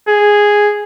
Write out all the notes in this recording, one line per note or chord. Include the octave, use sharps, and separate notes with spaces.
G#4